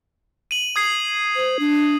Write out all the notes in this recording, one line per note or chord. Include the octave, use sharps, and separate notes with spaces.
D#7 F#7
D#6 G#6 C7
C5
D4